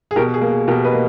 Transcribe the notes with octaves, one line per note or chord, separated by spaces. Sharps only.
G#4
B2 G4 A#4
G#4
A#3
G#4
B2 G4 A#4
B4 D#5
A#3